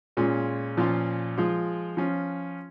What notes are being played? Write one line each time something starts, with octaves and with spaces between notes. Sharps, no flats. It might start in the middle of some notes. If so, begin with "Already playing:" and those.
A#2 G#3 C#4 F4
A#2 F3 C#4 F4
F3 G#3 F4
F3 C#4 F4